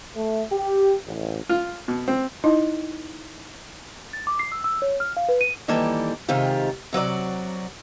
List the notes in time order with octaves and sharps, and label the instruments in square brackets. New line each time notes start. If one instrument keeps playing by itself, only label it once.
[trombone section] A3
G4
A1
[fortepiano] F4
B2
C4
[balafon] D#4 E4 D#5
[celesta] A6
D6
C7
E6
E6
C#5
F6
F5
B4
D#7
[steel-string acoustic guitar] D#3 E3 G3 A#3 A4
C3 D#3 G#3 F4 G4
C3 F#3 F#4 D5